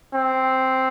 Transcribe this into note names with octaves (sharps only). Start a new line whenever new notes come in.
C4